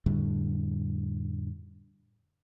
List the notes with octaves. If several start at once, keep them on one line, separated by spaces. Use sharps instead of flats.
F2 A2 D3 G3